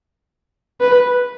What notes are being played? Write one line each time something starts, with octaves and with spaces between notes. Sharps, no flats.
B4